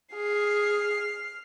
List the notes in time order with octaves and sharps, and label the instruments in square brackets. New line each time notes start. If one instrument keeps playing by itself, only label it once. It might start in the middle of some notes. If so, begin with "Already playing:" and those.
[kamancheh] G#4 [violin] F6 C7